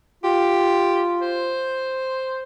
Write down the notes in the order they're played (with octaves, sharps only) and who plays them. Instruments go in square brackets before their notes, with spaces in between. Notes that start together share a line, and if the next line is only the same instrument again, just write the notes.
[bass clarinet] F4 [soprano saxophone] G4
[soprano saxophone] C5